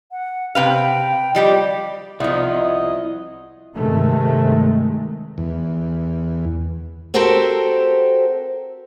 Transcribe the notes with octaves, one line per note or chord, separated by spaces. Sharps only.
F#5
C3 B4 F5 G5
F3 G3 G4 D#5
C2 F3 D#4 E4 E5 F#5
D#5
G2 C3 D#3 G#3 A3
E2
C4 F#4 G4 A4 A#4 C5